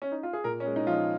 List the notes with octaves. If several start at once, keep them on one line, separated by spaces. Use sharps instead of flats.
C#4
D#4
F4
G#4
A#2 A#4
C#4
G#3
D#4
F3 F4
D#4